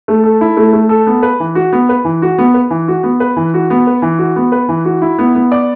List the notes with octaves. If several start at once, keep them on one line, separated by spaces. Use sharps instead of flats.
A3
A4
E4
A3
A3
A4
B3
B4
E3
F#4
B3
B4
E3
F#4
B3
B4
E3
F#4
B3
B4
E3
F#4
B3
B4
E3
F#4
B3
B4
E3
F#4
E4
B3
B3
D5